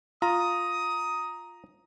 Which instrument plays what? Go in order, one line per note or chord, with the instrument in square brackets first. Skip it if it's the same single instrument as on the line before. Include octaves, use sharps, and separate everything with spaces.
[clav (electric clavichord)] F4 [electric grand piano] A#5 [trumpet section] D#6